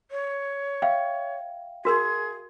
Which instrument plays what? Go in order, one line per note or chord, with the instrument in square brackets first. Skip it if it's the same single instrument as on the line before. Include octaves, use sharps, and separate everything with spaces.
[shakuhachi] C#5
[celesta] E5 F5 G5
[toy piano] F#4 A#4 C6 [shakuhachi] G#4